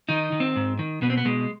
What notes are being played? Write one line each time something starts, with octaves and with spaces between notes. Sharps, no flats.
D#3 D#4
D#3
C4
G#2
D#3
B2 B3
C4
B3
B2 G#3